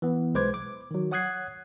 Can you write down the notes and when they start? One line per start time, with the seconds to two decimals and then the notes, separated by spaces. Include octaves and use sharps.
0.02 E3 B3
0.34 B1 G#3 B4 C5 D6 G#6
0.54 D6
0.91 D#3 F#3
1.11 C#5 F#5 D#6 F#6 G#6 C7